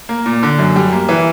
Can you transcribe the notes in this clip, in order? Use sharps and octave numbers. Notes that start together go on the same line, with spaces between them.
A#3
A#2
D3
F#2
G3
A#3
E3